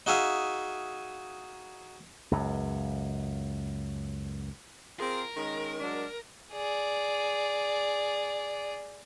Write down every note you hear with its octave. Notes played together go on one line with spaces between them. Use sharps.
D#4 F#4 G#4 E5 F5
C#2 F#2
C4 F4 G#4 A#4
D#3 G#3 C#4
F#3 G#3 D4
G#4 D5